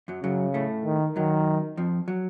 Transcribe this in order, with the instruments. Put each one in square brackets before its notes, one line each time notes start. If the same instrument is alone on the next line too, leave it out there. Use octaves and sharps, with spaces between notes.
[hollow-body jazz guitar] F#2 F#3
[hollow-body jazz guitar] F#2 F#3 [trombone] C#3
[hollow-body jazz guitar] A2 A3
[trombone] D#3
[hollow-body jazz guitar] F#2 F#3 [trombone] D#3
[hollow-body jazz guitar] F2 F3
F#3